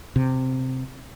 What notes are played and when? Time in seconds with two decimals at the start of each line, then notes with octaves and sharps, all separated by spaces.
0.16 C3